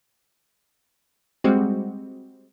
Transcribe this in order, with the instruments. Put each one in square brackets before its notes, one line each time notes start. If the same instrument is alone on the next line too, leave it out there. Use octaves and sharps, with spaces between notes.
[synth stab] G3 G#3 C4 F#4